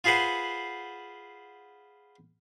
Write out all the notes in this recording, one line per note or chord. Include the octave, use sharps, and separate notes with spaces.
F4 G#4 B4 C5 F#5